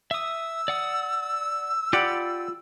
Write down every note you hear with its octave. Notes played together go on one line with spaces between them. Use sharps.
E5 D#6 E6
D5 F#5 D#6
F4 G4 D5 F#5 B5